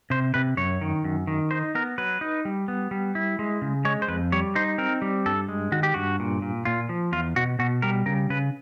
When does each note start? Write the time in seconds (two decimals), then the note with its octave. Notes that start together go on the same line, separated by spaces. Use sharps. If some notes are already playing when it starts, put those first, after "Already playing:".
0.10 C3 C5
0.34 C3 B4
0.57 F#2 C#5
0.81 D#3
1.04 F#2
1.27 D#3
1.51 D#4 C5
1.75 B3 A#4
1.98 F#3 B4
2.21 D#4
2.45 G3
2.68 B3
2.91 G3
3.15 E4
3.39 G#3
3.62 C#3
3.85 G#3 C#5
4.02 C5
4.08 F2 B4
4.32 G3 C#5
4.55 D#4 C5
4.78 C4 A#4
5.02 G3
5.26 G2 A4
5.49 G#3
5.72 D#3 F#4
5.83 G4
5.94 G2 F#4
6.20 A#2
6.42 A#2
6.65 A#2 F4
6.89 F3
7.12 E2 F4
7.36 B2 F#4
7.59 B2 F#4
7.82 G3 A#4
8.06 C#3 A#4
8.30 C#3 B4